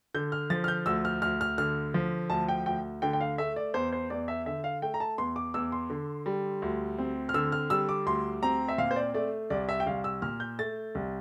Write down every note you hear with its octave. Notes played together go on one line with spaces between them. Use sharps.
D3 G6
F6
F3 A6
F6
G6
D2 E6
F6
D2 F6
F6
D3 F6
F3
D2 A5
G5
D2 G5
D3 G5
G5
F5
A3 E5
D5
E2 C5
C5
E2 D5
E5
D3 E5
F5
A3 G5
A#5
A5
E2 C6
D6
E2 E6
C6
D3
G3
D2
C4
F6
D3 E6
F6
G3 E6
D6
D2 C6
C4 A#5
E5
A#2 F5
C5
D5
A3 D5
C2 D5
E5
G5
C2 F5
E6
A#2 F6
G6
A3 A6
C2